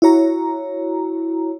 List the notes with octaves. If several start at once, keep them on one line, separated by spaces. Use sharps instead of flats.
E4 F#4 C#5 A#5